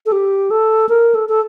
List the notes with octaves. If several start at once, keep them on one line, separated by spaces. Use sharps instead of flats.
A4
G4
A4
A#4
A4
A4